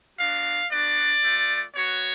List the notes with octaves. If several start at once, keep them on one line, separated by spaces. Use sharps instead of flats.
B3 D4 F#4 F5
B3 D4 F#4 D5
A3 F4
B3 F#4 C#5